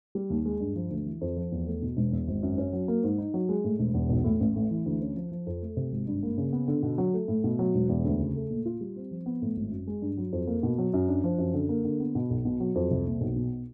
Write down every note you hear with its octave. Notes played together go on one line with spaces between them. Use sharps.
G3
D#2
G#3
G2
F3
D2
E3
F2
F3
E2
A3
B2
E1
E2
G#1
F#2
C#4
F#3
A#3
G#2
D#4
F#3
G#3
A2
E1
E2
B1
A2
A1
A2
E3
D2
C#4
F3
F3
F2
A3
C3
G#1
G2
A#3
C#3
B3
D3
B2
F#3
A3
A2
B2
F#3
E1
E2
D2
C#3
A3
A#2
F4
G3
C4
F3
B3
A2
G#1
F#2
G#3
G2
F#3
F2
A#3
B2
F#3
F#2
D4
F3
F#2
D3
A#3
D3
B3
B2
B1
B2
F#3
F2
C2
A#2
B1
B2